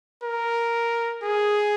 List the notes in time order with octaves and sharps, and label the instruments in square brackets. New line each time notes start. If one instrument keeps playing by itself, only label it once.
[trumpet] A#4
G#4